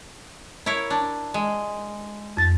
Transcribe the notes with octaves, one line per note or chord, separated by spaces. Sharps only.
E4 A#4 C#5
D4
G#3
F2 A6